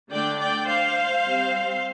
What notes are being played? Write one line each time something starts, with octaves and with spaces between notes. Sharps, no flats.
D3 A3 D4 D5 G5
D5 G5
C5 F5
G3 C4